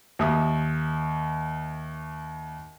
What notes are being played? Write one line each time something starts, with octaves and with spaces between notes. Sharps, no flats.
D#2 E5 D#6